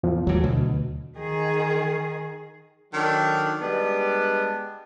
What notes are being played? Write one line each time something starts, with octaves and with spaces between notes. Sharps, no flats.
E2 F3
D#2 E3 F#3 A3
D2 B2
D#3 G#4
D#3 F#3 D4 F#4 A4
G3 G#3 B3 D4